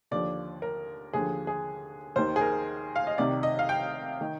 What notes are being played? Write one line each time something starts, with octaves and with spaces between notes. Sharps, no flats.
D#2 D3 F3 D5
A#4
D#2 D3 F3 G#4
G#4
D#2 D#3 C5
G#4
A#4
F5
D#5
C2 C3 D#3 D5
D#5
F5
G5
D#3